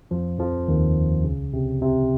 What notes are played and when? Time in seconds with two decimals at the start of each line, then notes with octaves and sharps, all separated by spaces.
0.11 F2 F3
0.39 F2 F3
0.68 D#2 D#3
1.24 C#2 C#3
1.53 C3
1.81 C3